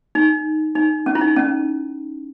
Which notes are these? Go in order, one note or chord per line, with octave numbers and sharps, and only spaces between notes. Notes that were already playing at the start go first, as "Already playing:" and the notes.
D#4
D#4
C#4
E4
D#4
C#4